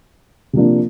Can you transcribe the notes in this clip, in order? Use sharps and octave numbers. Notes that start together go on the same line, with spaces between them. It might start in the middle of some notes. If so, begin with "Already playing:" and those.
C3 F3 A#3 D4